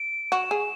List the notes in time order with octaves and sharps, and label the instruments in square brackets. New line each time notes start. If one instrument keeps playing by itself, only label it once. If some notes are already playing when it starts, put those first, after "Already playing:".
Already playing: [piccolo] D7
[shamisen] F#4 [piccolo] E7
[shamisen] G#4